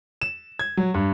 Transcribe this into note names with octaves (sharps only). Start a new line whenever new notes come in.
E7
G#6
F#3
G2